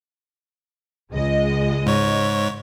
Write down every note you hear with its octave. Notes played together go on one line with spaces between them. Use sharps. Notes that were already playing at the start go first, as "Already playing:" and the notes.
C#2 G#3 D#5
G#2 C#5